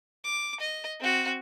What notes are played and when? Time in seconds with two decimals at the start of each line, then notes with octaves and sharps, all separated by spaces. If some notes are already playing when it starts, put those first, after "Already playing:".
0.24 D6
0.60 D#5
1.00 C4 F#4